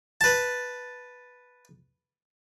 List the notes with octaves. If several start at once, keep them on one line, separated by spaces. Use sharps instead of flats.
B4 A5